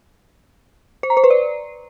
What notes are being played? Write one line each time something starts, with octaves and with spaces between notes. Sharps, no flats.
C5
A#5
C5
B4
D5